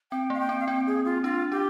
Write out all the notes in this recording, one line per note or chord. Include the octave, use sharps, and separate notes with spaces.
C4 G5
A#3 F5
G5
C4
F5
C4 G5
G#4
F4
D4 F4
D4 G4